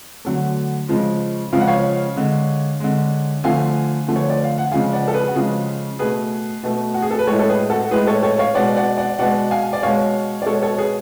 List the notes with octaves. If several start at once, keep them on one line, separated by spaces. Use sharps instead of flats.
D3 F#3 A3
C#3 F3 G#3
C#3 F3 G#3 F5
F#5
C#5 F5
D3 G#3
D3 G#3
D3 F3 A3 F5 G#5
D3 F3 A3
C#5
D5
F5
F#5
C#3 F3 G#3 F5 G#5
D5 F#5
A4
G#4 B4
F#4
C#3 F3 G#3 F4 G#4
B2 A3 G#4 B4
B2 A3
F#4
G#4
A4
B4
A2 G#3 A4 C#5
A4
G#4 B4
F#4 A4
A2 G#3 G#4 B4
A4 C#5
A4 C#5
C#5 F5
B2 G#3 D5 F#5
D5 F#5
D5 F#5
B2 G#3 D5 F#5
F5 G#5
D5
B2 G#3 C#5 F5
D5
B2 G#3 A4 C#5
A4 C#5
G#4 B4